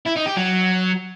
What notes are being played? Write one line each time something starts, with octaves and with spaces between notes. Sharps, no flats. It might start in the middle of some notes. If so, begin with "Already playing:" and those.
E4
D#4
G4
F#3